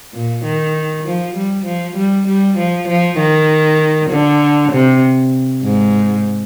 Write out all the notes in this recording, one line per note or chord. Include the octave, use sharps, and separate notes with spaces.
A#2
D#3
F3
G3
F3
G3
G3
F3
F3
D#3
D3
C3
G#2